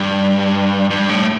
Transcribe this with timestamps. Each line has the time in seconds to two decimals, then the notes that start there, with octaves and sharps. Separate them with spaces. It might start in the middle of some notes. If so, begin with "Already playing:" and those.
Already playing: G2
0.91 G2
1.09 A2